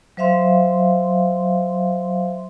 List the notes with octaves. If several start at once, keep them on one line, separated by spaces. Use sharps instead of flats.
F#3 C5 E5 F5 C6